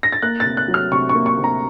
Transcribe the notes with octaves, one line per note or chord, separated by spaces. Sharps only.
A#6
A6
A#3 F#6
A6
C3
F#6
F#3
F6
C3 C#6
C#6
A#3
C#6
C3
A#5